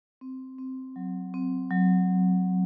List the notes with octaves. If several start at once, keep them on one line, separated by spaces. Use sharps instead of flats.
C4
C4
F#3
C4
F#3